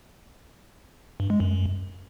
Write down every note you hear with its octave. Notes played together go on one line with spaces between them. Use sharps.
G2
G#3
F#2